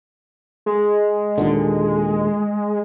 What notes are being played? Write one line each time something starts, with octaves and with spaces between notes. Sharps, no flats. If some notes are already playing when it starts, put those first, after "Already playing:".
G#3
D#2 A#2 D3